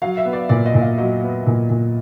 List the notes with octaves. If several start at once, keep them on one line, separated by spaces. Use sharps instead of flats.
F#3 F5
E5
B3
D5
A#2 D5
D#5
A#2
F5
F#3 D#5
B3
A#2
A#2